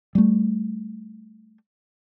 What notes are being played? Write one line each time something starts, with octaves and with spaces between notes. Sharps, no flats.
G3 A3